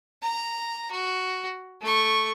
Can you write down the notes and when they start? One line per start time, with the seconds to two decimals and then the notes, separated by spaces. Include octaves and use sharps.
0.22 A#5
0.91 F#4
1.81 A3 C#6